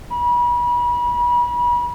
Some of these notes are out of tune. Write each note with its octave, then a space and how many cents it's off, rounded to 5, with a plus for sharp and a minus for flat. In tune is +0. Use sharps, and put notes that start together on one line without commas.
B5 -35